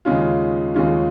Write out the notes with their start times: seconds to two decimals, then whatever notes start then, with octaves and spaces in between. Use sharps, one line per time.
0.05 D#2 C#3 G#3 C#4 F4
0.74 D#2 C#3 G#3 C#4 F4